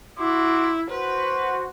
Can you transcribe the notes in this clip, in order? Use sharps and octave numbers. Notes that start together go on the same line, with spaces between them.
E4 F#4 C6 D6
F#4 B4 C5